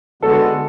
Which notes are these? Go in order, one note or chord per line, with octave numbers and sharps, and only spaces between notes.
D3 G#3 B3 F#4 A4